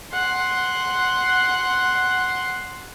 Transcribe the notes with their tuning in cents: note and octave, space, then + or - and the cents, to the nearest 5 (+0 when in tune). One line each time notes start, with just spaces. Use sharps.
F#5 +0 C6 +0